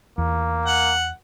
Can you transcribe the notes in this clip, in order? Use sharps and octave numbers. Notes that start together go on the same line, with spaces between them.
E2 A#3
F#5